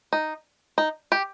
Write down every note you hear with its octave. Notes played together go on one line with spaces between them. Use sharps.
D#4
D#4
G4